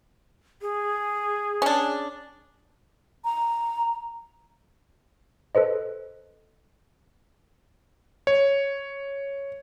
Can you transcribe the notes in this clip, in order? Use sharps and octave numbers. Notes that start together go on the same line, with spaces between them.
G#4
C#4 D4
A#5
A4 B4 C5 D#5
C#5